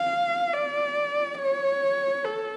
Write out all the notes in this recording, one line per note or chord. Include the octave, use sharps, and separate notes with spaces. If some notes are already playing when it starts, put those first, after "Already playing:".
Already playing: F5
D5
C#5
A4